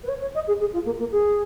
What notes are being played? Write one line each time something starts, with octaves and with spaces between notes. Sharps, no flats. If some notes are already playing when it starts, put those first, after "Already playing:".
B4
C#5
C#5
D#5
G#4
G#4
F4
A#3
A#3
G#4